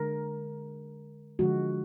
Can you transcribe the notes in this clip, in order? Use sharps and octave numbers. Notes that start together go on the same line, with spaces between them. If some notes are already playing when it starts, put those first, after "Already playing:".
Already playing: D3 G#3 A#4
D3 F3 G#3 F#4